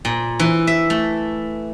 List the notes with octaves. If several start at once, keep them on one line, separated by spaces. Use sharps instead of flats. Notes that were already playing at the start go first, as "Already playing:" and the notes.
A#2
E3
E5
A3